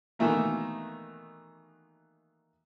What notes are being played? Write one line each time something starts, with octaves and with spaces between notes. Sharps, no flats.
B2 D#3 E3 A3 A#3